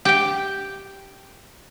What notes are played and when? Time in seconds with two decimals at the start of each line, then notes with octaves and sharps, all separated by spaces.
0.05 G4 G5